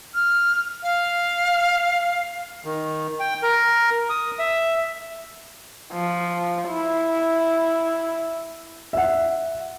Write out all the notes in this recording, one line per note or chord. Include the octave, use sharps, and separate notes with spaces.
F6
F5
D#3
G5
A#4
D#6
E5
F3
E4
E5 F#5